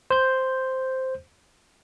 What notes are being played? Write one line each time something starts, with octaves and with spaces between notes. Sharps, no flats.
C5 G6